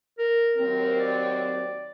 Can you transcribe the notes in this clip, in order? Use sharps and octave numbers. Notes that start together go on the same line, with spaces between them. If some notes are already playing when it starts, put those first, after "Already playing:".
A#4
D#2 F#3 C4 A#4
D5